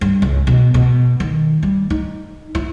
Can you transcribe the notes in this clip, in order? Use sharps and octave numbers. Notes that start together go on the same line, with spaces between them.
G2
C#2
B2
B2
D#3
G3
D#4
E4